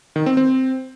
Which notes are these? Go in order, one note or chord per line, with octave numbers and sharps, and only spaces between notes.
D#3
C4
C4